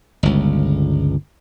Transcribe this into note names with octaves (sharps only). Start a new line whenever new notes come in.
G1 C#2